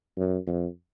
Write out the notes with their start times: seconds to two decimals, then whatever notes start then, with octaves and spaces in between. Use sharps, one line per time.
0.18 F#2
0.47 F2